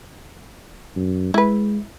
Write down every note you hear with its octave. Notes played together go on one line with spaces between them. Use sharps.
F#2
G#3 E4 B4